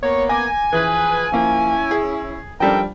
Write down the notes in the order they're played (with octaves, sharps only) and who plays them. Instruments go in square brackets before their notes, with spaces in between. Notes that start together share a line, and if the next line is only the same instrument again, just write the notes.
[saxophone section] A#3 B3 [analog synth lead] C#5
[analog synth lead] G#5 [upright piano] D6 A#6
[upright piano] E3 [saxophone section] F3 G#4 B4
[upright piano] F3 A#3 [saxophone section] C#4 E4
[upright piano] G#4
[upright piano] F3 G3 D4 [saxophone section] D#4 A4 A#4 [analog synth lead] G5